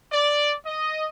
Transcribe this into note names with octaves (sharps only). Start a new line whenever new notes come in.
D5
D#5